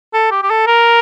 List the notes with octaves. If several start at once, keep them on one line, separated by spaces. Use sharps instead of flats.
A4
G4
G4
A4
A#4